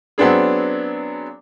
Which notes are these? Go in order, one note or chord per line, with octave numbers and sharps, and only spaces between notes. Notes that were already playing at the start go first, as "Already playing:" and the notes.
F#3 B3 C4 D4 G#4